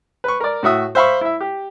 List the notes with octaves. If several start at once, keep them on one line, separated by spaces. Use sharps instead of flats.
B4 C#6
A#4 D5
A2 F#4 E5 D#6
C5 E5 F5 B5 C#6
E4 E5
G4